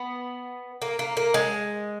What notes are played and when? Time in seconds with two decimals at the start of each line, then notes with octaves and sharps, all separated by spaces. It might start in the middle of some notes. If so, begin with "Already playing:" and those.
Already playing: B3
0.82 A#3
0.99 A#3
1.17 A#3
1.34 G#3